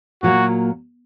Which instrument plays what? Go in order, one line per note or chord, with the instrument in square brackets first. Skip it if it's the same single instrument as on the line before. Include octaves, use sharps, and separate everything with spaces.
[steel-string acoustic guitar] A#2 F#3 A#3 [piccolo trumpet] F#4